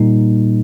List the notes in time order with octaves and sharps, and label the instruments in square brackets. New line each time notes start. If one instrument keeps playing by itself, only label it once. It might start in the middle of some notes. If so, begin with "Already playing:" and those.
Already playing: [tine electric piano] A#2 G3 A#3 D#4